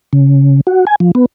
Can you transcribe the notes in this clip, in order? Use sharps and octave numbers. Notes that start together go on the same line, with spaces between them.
C#3
F#4
G#5
F3
B3